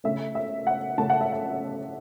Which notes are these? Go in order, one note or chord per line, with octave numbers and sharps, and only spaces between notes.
C#3 A3 C#4 E5
E5
F#5
C#3 A3 C#4 A5
F#5
E5
F#5